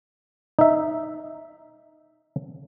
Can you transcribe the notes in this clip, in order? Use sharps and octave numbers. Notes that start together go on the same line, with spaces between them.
D#4 E5